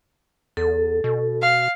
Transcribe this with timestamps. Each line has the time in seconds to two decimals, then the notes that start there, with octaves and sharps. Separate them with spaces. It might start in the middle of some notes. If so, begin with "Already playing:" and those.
0.57 E2 A4
1.04 B2
1.41 F5